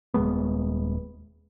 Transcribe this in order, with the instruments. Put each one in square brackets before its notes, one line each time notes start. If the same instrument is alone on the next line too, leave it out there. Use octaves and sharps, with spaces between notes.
[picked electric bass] D#1 D#2 G#3 B3